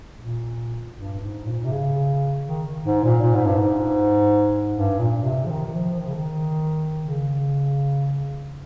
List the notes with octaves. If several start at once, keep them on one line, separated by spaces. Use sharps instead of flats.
A#2
G2
G#2
A#2
C3
C#3
D#3
G#2
A#2
A#2
G#2
G2
G#2
G2
A#2
C3
F3
D#3
D#3
F3
D#3
C#3
D#3
C#3